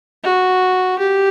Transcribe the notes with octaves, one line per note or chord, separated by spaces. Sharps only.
F#4
G4